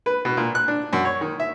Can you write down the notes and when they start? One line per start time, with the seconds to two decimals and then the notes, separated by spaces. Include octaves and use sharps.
0.06 B4
0.25 B2
0.37 A#2
0.55 F#6
0.68 D4
0.93 F#2
1.05 C#5
1.21 D#3
1.40 E5